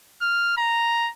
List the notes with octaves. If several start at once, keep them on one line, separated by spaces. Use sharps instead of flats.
F6
A#5